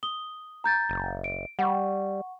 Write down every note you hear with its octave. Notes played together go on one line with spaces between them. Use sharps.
D#6 G7
A#5 G6 A6
F#1
D7
G3 F#5 C#6